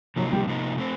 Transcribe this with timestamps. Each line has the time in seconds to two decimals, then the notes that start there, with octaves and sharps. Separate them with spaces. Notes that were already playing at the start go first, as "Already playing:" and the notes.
0.16 C3 F3 F#3 A#3 D#4
0.32 G3
0.47 C3 F3 A#3 D#4
0.78 A3 C4